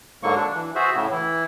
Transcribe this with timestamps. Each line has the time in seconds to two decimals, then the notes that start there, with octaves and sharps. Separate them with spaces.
0.23 G#2 D3 F#3 A#3 C#6
0.36 D4
0.54 E3
0.75 F#4 G#4 C5 E5
0.95 A2 C#3
1.11 E3 E4